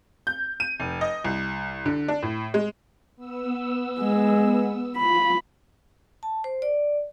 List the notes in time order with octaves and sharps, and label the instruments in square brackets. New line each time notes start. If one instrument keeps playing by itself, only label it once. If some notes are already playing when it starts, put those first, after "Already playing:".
[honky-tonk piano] G6
D#7
F1
D#5
C2
D3
D4
A2
G#3
[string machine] B3 E6
[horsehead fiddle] G#3
[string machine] F4 [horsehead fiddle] B5
[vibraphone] A5
C5
D5